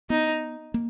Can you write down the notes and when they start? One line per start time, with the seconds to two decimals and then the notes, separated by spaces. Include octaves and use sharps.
0.10 B3 D#4
0.74 A#3